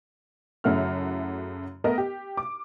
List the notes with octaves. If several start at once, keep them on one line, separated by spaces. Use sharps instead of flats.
F#2 C#3 A3 E4 F#4 F6
A3 B3 A#4 D#5
G4
D6